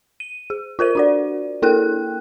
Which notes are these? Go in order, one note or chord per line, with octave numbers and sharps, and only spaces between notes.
D#7
G#4
F4 A#4 C5 D#7
D4 F#4 D5
A#3 E4 A4 A#4 G5 F#6